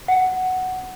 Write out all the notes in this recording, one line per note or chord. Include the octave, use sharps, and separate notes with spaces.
F#5